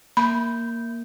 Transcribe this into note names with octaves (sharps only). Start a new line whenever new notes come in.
A#3 B5 G6